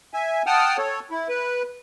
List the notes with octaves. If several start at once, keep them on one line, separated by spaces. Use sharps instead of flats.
E5 G#5
F#5 G5 A5 D#6 F6
A4 C#5
E4
B4